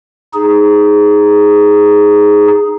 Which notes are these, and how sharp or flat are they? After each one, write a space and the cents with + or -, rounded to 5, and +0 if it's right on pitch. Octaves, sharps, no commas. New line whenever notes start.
D#4 +0 G#4 +0